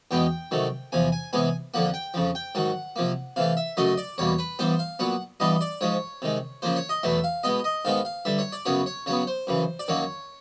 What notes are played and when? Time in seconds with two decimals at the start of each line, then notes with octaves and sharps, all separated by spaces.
0.11 E2 B2 G#3 B3 G5
0.51 C3 D#3 F#3 A3
0.92 E2 C3 F3 G#5
1.12 G#5
1.33 C3 E3 G#3 B3 G#5
1.74 F2 D3 F3 A#3 F#5
1.94 G5
2.14 F2 C#3 F3
2.35 G5
2.55 G#2 D#3 F#3 F#5
2.96 C3 F3 A#3
3.36 C3 E3 A3 F5
3.57 E5
3.77 F#2 C#3 F#3 A3 D#5
3.97 D5
4.18 E2 B2 G3 A#3 C#5
4.39 B4
4.59 G2 E3 G3 B3 C5
4.79 F5
4.99 A#2 F#3 B3 F#5
5.40 G2 E3 G3 B3 D#5
5.61 D5
5.81 G#2 F3 G#3 C#5
6.22 C3 D#3 G#3
6.62 C#3 F3 A#3 C5
6.76 C#5
6.89 D#5
7.03 E2 B2 F#3 A3 E5
7.24 F5
7.43 B2 G#3 B3 D#5
7.64 D#5
7.85 G#2 D#3 G#3 B3 F5
8.05 F5
8.25 G2 D3 G3 E5
8.39 C#5
8.52 D5
8.65 F#2 C#3 F#3 B3 C#5
8.86 C#5
9.06 C#3 F#3 B3 C#5
9.27 C5
9.47 F#2 C#3 E3
9.79 D5
9.88 F#2 D#3 F#3 A#3 C#5